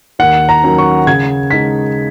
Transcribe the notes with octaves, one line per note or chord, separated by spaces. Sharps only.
D#2 F#5
A#5
D#3 F#3 C#4
C#6
C#3 G#6
G#3 D#4 B6